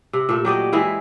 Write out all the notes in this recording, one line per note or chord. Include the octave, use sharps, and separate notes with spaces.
C3
A#2 A3
F#3 G4 D5 D#5
E3 G#3 E4